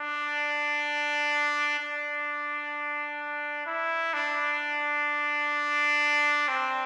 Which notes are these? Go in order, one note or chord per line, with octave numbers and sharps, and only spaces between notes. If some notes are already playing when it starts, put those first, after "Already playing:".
Already playing: D4
D4
E4
D4
C4